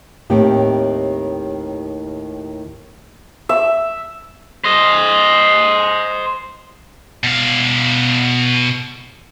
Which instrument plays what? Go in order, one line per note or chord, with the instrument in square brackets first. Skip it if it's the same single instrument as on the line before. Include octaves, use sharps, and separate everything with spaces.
[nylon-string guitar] D#2 A2 D#3 C4 G4
[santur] E5
[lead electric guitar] C5 D#5
[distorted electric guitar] B2 F5